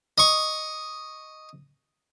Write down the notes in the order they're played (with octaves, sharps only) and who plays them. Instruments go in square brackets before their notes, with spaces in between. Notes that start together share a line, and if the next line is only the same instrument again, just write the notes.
[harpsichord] D#5 C#6